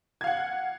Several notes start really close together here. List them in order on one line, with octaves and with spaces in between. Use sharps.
G#6 F5 F#5